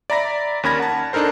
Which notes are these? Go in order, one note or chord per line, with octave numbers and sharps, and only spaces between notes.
D5 E5 A#5 B5 A#6
D#2 C#4 A#4 B5 G#6 A#6
F#5 A5
D4 D#4 A4 A#4 C5